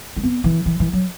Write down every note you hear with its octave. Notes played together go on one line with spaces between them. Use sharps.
A3
B3
E3
E3
E3
F#3